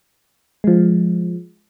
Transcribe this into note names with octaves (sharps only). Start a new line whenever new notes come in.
F3 G#3